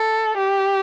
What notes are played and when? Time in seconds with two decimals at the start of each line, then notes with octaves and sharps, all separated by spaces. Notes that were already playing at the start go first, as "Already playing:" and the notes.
Already playing: A4
0.38 G4